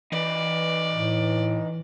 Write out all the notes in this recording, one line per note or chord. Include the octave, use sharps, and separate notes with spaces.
E3 D#4 B4 D5
A2